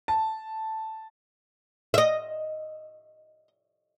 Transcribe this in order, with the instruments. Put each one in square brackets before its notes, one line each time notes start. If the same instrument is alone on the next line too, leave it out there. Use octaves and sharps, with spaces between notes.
[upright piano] A5
[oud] D#5 E5